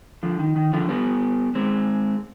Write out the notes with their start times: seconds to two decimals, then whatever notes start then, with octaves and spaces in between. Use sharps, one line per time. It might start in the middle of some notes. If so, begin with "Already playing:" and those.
0.23 D3 F3
0.39 D#3
0.56 D#3
0.73 D3 F3
0.89 G3 B3
1.55 G#3 C4